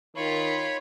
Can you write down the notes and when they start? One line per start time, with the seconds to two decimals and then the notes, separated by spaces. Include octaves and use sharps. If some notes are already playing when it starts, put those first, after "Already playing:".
0.17 D#3 F4 C#5 B5 C#6